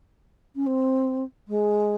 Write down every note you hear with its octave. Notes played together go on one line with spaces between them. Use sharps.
C#4
C4
G#3